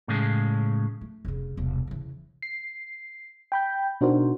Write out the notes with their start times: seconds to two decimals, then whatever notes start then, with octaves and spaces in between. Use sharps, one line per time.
0.08 A2 C#3 G#3
1.01 A3
1.25 F1 C#3
1.57 E1 C2
1.87 C#3 E3
2.42 C7
3.52 G5 B5 G6
4.01 B2 D4 D#4 F#4 A#4 C5